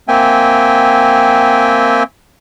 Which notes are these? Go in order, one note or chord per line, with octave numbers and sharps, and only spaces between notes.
A#3 C4 E5 G5 G#5